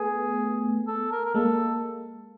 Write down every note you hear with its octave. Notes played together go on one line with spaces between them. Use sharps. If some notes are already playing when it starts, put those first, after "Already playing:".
Already playing: A3 B3 G#4
A4
A#4
A#4
G#3 A#3 A4